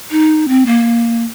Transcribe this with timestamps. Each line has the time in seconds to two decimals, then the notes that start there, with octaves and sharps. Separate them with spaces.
0.11 D#4
0.48 C4
0.66 A#3